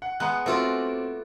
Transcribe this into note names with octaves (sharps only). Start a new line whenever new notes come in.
F#5
G#3 B3 F#5 A#5 F#6
A3 C4 F4 F#4 D5